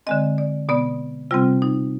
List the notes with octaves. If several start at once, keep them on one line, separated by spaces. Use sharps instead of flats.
D3 G#3 C4 D#5
D5
B2 B3 D5
C3 G3 C4 F4
D#4